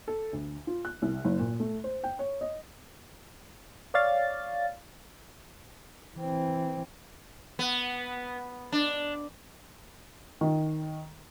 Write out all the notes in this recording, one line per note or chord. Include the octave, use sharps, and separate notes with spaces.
A4
D2
F4
F#6
C2
F#1
A#2
A3
C5
G5
C#5
D#5
C#5 D5 F5 A6
E3 C4
B3
D4
D#3